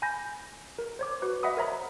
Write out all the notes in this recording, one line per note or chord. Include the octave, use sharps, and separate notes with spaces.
G#5 B5 G6 A#6
A#4
C5 C#5 D6
F#4 B4
D#5 E5 F#5 B5 D#6
A#4 C5 C#5 E5 A#5 B5